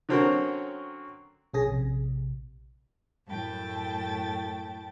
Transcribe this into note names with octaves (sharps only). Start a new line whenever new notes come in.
D3 F#3 C4 C#4 A#4 C#5
B1 C#4 G#4 G#5 A#6
A#1 C3
F#2 A2 A3 G5 A5 A6